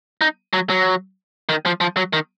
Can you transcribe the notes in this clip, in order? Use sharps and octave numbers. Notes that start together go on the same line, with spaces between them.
D#4
F#3
F#3
D#3
F3
F3
F#3
D#3